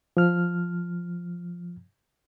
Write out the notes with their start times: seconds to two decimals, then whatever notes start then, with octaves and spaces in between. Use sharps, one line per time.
0.17 F3 F6